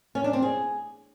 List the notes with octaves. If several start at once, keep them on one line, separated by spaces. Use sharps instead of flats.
C#4
D4
C4
G#4